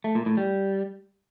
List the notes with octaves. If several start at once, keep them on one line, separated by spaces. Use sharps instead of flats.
A3
A#2
A2
G3